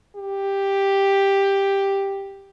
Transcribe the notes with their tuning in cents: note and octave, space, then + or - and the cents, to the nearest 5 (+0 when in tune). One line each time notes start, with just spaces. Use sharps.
G4 +5